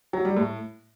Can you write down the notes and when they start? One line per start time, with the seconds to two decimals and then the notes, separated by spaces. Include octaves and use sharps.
0.13 F#3
0.25 G3
0.36 A2